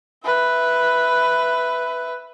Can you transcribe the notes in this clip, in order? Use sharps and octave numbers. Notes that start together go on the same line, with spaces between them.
B4 E5